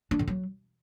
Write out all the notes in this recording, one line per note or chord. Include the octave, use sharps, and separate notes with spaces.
D4
D3
F#3